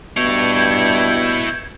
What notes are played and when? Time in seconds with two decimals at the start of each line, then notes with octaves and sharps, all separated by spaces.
0.17 G2 B2 E4 C#5 G6 G#6